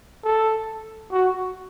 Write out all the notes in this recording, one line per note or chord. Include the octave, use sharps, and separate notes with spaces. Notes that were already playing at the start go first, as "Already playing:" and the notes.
A4
F#4